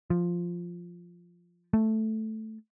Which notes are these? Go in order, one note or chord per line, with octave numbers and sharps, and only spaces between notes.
F3
A3